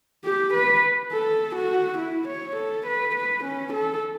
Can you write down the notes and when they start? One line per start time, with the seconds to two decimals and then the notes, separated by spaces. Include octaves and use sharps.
0.25 G4
0.54 B4
1.12 A4
1.55 F#4
1.98 E4
2.28 C#5
2.56 A4
2.86 B4
3.15 B4
3.44 C#4
3.73 A4